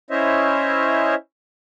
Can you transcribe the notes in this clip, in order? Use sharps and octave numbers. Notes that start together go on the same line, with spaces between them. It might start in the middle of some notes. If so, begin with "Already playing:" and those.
C#4 E4 C5 C#5 D#5 E5